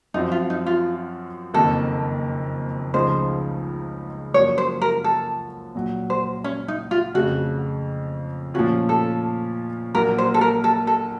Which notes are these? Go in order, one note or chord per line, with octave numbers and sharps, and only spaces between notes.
F#2 F3 C4 D#4 F#4
F4
D#4
F4
F#1 F2 D#3 A#3 A4
C#2 C#3 F3 A3 D#4 C5
F#2 F3 A#3 C#4 F#4 C#5
C5
A#4
A4
A#1 A#2 F#3
C5
C#4
D#4
F4
F2 C#3 A3 F#4
A#2 F3 A3 C#4 F4 F#4
A4
A#1 A#2 F#3 A#3 A#4
C5
A4
A#4
A4
A4